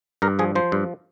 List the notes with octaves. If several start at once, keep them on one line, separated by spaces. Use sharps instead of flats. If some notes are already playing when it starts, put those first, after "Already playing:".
G2 A#4
F3 G#4
F3 C5
G2